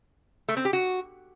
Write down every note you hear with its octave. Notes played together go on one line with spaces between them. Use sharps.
A3
C4
G4
F#4